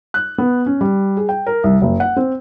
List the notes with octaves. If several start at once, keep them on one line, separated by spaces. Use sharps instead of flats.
F#6
B3
C#4
G3
G#4
G5
A#4
C2
F#1
F#5
C4